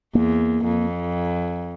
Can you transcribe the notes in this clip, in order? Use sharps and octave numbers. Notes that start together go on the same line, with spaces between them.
E2 A#3
F2